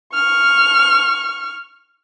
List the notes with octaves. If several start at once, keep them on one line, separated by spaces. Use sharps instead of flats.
C#6 F6